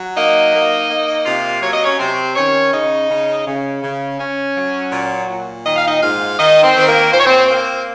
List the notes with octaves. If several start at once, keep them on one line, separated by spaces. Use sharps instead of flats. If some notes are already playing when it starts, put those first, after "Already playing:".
Already playing: F#3
A#3 D#4 D#5
A#3
A#3
C3 F4 F5
F#3 C#5
D#5
C#4 C#5
C3 C4 C5
D#3 C#4 C#5
C#3 D#4 D#5
C#3
C#3
C#3
C#4
F#3
A#2
A#2
D#3 D#5
F5
D#4 D#5
G#2 F4 F5
D#3 D#4 D#5
C4 C5
D#3 C5
A#3 A#4
A#2 C5
C#5
C4 C5
A#3 C4 C5